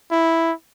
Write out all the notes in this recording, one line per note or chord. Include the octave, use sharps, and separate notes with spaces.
E4